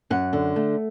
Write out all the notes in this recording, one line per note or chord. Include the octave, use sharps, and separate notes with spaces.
F#2 F#5
D3
A3